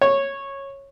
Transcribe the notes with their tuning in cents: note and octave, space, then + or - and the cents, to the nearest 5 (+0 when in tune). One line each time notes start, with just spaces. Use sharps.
C#5 -10